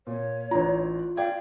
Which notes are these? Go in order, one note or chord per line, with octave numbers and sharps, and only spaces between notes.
A#2 C#5
A1 D4 F4 A#5
D5 F5 G5 G#6